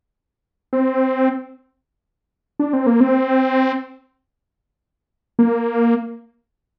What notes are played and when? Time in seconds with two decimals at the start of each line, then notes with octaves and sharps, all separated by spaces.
0.73 C4
2.60 D4
2.73 C4
2.86 A#3
3.00 C4
5.39 A#3